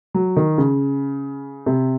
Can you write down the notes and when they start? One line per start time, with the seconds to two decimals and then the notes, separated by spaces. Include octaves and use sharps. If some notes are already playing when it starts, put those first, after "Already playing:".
0.14 F#3
0.36 D#3
0.58 C#3
1.66 C3